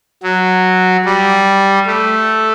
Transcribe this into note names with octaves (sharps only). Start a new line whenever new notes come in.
F#3
G3
A3